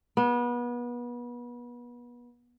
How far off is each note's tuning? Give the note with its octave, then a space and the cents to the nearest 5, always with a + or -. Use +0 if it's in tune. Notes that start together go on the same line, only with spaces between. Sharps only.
B3 -30